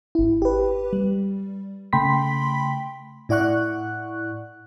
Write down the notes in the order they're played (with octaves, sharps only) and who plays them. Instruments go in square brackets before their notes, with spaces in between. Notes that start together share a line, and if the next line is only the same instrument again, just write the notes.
[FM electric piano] G#1 E4
G4 B4
G3
C#3 A3 G5 B5 C6 B6
A2 E4 D5 F#5 C#6 F#6